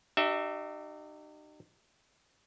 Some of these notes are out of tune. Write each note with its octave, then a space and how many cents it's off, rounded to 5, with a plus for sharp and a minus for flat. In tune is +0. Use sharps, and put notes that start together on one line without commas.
D#4 -40 G4 -35 E5 +0